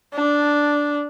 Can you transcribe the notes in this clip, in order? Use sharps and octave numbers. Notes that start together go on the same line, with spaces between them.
D4